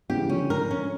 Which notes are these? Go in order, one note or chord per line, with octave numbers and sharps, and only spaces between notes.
C#3 E3 G4
D3 F3 C#4
A#4
C#4